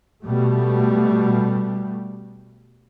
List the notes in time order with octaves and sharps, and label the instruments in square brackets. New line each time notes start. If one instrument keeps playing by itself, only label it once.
[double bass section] B2 G3 A3